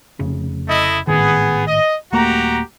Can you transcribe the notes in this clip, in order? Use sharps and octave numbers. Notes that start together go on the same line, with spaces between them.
F1 C#3
A3 E4 D#5
G#1 A2 D#3 B3 G#4
D#5
D#1 A3 A#3 F#4 G4 A#5